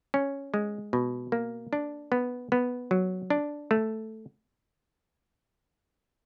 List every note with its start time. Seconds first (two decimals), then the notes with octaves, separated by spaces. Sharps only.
0.14 C#4
0.54 G#3
0.93 B2
1.32 A#3
1.73 D4
2.12 B3
2.52 B3
2.91 F#3
3.30 D4
3.71 A3